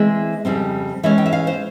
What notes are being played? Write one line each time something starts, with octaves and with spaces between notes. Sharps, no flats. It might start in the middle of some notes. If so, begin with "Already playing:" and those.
Already playing: E3 G#3 C4 E4 E5
F2 C#3 G3 C4
E3 G#3 C#4 E5
G5
E5
F5
C5